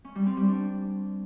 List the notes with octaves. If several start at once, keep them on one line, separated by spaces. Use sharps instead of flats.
C#4
G3
C4
G3
D4